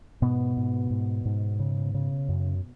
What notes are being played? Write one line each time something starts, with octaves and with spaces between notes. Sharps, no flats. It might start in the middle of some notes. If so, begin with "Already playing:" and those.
G#2 B2 B3
G#2
G#2
G#2
C#3
C#3
F#2